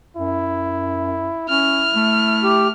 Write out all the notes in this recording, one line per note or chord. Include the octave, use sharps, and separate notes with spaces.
F#2 E4
C#4 E4 F6
A3
G4